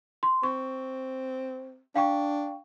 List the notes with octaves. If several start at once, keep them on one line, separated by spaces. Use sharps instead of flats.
C6
C4 C#6
D4 F5 G5 C#6